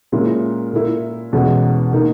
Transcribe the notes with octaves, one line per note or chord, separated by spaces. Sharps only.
A#2 G#3 C#4 E4
A#2 A#3 E4
E2 B2 G#3 C#4
B2 A#3 D#4